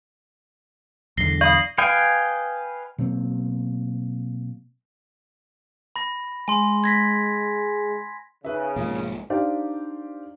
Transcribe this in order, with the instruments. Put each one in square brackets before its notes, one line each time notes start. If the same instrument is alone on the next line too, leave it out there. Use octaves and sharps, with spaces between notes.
[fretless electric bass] B1 E2 D3 [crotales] A#6 C7 G7
[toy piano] D5 [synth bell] F5 B5 D#6 [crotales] C#6 F#7
[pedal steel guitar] B4 D#5 F5 G5 G#5
[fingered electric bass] B2 F#3 A#3 C4
[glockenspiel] B5 A#6
[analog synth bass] G#3 [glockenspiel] G#5 C6
[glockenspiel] G#6 A#6 B6
[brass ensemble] C#3 [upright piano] D#4 B4 E5
[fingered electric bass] B1 G#2 F3 [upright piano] A#3
[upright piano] D4 D#4 G4 C5 D5 F5